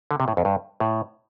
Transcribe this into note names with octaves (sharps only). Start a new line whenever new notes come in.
D3
C3
A2
F2
G2
A2